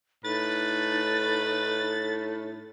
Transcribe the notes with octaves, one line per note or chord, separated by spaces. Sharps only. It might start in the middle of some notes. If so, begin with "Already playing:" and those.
A2 D#4 B4 A6